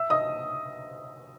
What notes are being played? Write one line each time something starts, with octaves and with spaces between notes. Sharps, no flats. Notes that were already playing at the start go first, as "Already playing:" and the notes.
Already playing: E5 E6
D#5 D#6